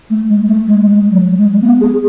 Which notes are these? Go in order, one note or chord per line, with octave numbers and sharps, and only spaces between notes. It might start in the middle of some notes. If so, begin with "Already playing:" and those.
A3
G#3
A3
G#3
G#3
F#3
G#3
B3
G#4